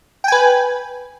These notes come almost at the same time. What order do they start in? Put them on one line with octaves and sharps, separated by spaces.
G5 G#5 B4